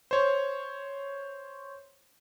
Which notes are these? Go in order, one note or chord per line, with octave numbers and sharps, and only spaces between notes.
C5 C#5